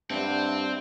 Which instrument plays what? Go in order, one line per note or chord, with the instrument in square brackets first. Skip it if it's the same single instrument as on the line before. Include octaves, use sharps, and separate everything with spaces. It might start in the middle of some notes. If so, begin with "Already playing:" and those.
[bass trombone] G2 [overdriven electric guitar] C4 [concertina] D4 [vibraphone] E5 F#5